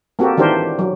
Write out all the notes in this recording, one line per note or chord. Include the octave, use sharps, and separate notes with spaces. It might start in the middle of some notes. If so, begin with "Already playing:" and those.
A#3 C4 F#4 G4 A4
D#3 E3 D4 G4 A#4 C5
F#3